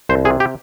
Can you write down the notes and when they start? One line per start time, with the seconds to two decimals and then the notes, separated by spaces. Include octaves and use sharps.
0.09 C2 C5
0.25 C3 G#4
0.40 G4